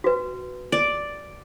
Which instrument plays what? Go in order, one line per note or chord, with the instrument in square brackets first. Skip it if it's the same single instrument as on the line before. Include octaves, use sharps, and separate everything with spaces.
[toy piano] F#4 B4
[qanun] D5